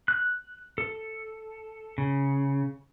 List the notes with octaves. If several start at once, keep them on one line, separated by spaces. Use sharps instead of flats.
F#6
A4
C#3